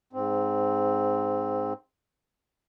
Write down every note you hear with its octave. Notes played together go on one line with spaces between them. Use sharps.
G#2 C4